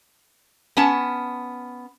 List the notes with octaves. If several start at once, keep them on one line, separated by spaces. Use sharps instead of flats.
B3 C#4 A5